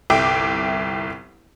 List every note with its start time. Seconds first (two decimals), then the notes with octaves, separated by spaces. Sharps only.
0.10 G1 C2 E5 G5 D6